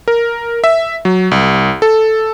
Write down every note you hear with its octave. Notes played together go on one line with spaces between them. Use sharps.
A#4
E5
F#3
C2
A4